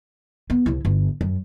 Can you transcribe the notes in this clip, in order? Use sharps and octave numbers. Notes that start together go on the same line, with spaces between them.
B3
C2 E4
G1
F#2